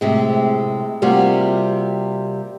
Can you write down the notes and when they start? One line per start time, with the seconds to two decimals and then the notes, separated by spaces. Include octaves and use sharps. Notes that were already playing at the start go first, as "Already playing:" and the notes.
0.01 A2 C3 G#3
1.02 C3 G3 A#3 F4 F#4